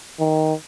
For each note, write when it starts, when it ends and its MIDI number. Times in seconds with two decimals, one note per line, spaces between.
0.20 0.54 51